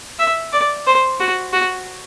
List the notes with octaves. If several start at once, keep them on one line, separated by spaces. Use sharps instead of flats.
E5
D5
C5
F#4
F#4